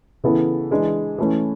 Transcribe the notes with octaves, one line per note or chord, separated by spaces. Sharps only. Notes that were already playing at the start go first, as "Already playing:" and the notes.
C#3 E3 B3 E4 A4
E3 G#3 D4
E3 A3 C#4